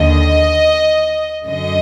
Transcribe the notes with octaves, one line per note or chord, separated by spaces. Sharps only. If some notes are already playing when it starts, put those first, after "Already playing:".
Already playing: D#2 D3 D#5
F#2 D3 D#5